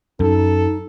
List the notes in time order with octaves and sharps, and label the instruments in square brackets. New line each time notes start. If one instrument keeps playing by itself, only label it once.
[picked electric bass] F#2 [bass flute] D#4 [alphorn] A4